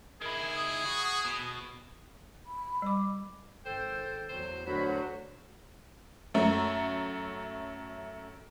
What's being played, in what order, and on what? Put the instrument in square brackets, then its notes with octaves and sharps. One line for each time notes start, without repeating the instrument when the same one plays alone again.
[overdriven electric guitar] D#3 E4 [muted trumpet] G#4
[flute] D#6
[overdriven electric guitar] F#4
B2
[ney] B5
[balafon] G3 D6
[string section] G#1 [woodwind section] A4 G5 [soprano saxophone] C5
[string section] E2 F#3 [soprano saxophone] C5
[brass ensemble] D2 F#3 [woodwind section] G#3 A#4 B5 [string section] F#4 [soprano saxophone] C5
[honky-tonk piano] F#2 A3